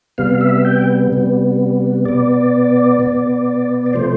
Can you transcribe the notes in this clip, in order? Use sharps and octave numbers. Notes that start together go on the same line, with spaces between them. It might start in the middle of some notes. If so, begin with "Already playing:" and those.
C3 G3 B3 F5
E5
G5
C3 G3 B3
B2 B3 D5
B2 B3
D5
C3 F3 A3 C5